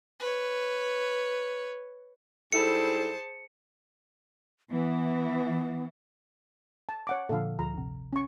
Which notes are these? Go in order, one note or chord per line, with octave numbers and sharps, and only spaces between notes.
B4 C#5
G#2 G3 E4 G#4 A4 C5 A5 C#7
E3 B3
A5
C#5 F#5 D6
A#2 D3 F3 A4 F5
D2 F3 A#5
G#1 C3
C#4 C#6